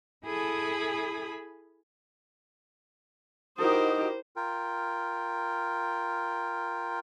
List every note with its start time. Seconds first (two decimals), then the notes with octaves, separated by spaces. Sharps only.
0.24 E4 G#4 A4 G#5 B5 D#6
3.58 D#4 E4 F#4 G4 A#4 C5 D#6
4.36 F4 A#4 G5